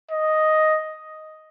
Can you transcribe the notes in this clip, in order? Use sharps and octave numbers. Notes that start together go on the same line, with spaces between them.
D#5